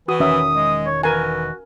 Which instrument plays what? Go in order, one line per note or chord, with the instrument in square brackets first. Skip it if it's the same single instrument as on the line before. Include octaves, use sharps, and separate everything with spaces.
[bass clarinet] E3 [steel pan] F#4 D#6
[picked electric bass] E1 A#1 D#3 [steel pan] C#4 E5 [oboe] D#6
[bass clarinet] G#3
[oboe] C#5
[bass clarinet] E3 [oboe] F#4 [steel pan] A#4 G#5